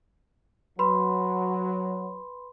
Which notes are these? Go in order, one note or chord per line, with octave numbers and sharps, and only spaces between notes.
F#3 B4 B5 C6